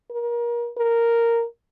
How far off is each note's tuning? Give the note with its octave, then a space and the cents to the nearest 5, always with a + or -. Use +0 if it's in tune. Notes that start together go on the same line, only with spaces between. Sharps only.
A#4 +30
A#4 -5